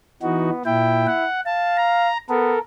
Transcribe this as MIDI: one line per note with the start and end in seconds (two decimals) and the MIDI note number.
0.22 0.50 52
0.22 0.63 59
0.22 0.50 63
0.22 0.50 66
0.65 1.06 46
0.65 1.25 64
0.65 1.06 79
1.07 1.40 78
1.46 2.10 77
1.46 1.77 81
1.77 2.18 82
2.29 2.56 59
2.29 2.59 69
2.29 2.59 70